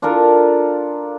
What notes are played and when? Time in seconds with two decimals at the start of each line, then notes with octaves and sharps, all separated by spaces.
0.02 D4 F4 A4 A#4